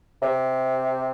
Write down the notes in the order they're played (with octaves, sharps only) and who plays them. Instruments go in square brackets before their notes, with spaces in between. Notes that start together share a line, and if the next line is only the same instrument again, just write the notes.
[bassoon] C3